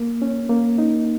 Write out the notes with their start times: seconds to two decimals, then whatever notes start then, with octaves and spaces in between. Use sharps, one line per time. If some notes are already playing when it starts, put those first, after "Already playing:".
Already playing: A#3
0.22 C#4
0.50 A#3
0.78 D#4